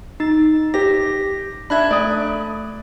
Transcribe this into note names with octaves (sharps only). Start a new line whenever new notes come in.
D#4 A6
G4 A#6
D4 E5 B5 F#6 G#6
A3 D5 D#6